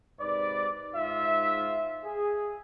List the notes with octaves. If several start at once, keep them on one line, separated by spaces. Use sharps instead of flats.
G#2 C3 B4 D5
G#2 F4 E5
G#4